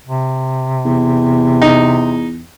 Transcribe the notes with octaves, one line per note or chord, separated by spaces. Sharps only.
C3
E2
D#4